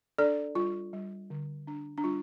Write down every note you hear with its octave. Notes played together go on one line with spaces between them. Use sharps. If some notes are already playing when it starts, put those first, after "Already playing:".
D4 A4 D5
G3 F4
G3
D3
D4
D4
G3 F4